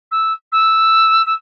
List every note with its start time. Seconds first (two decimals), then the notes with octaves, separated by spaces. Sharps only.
0.11 E6
0.52 E6
1.26 E6